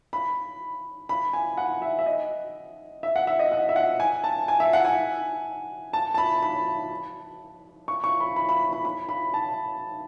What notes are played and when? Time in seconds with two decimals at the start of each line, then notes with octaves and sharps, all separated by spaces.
0.13 B5
1.09 B5
1.33 G#5
1.58 F#5
1.82 E5
1.99 E5
2.06 D#5
3.03 E5
3.16 F#5
3.27 E5
3.39 D#5
3.52 F#5
3.69 E5
3.76 F#5
4.00 G#5
4.24 A5
4.48 G#5
4.60 E5
4.73 F#5
4.85 G#5
5.93 A5
6.14 A5
6.18 B5
6.43 B5
7.88 C#6
8.04 C#6
8.20 B5
8.36 B5
8.49 B5
8.73 B5
8.85 B5
9.09 B5
9.34 A5